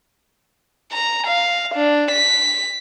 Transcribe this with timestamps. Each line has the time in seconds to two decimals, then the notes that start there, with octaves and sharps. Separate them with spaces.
0.92 A#5
1.27 F5
1.75 D4
2.11 B6